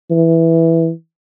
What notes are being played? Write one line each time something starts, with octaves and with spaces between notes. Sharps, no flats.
E3